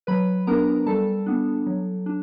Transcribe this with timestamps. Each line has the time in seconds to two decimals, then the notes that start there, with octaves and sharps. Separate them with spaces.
0.07 F#3 B4 B5
0.47 B3 D4 A#4 A#5
0.86 G3 A4 A5
1.26 B3 D4
1.66 F#3
2.06 D4